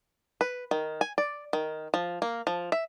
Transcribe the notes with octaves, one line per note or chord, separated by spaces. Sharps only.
B4
D#3
G#5
D5
D#3
F3
A#3
F3
E5